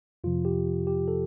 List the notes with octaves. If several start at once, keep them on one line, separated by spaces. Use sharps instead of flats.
F2 C3 F3 F4
G4
G4
A4